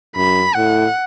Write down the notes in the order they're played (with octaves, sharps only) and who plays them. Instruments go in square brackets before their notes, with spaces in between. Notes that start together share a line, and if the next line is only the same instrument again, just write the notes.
[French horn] F#2 [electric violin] B5
[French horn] A2 [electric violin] F#5